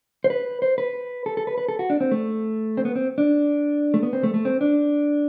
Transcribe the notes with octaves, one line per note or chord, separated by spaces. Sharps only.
C5
B4
C5
B4
A4
A4
B4
B4
A4
F#4
D4
C4
A3
C4
B3
C4
D4
A3
B3
C4
A3
A3
C4
D4